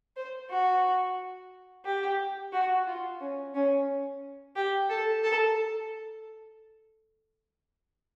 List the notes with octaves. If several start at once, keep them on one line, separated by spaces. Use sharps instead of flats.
C5
F#4
G4
F#4
F4
C#4
C#4
G4
A4
A4